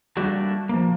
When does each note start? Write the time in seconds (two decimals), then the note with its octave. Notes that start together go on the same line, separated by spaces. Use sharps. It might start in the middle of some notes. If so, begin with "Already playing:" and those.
0.17 G3 A3 A#3 D4 F#4 A4
0.69 F3 A#3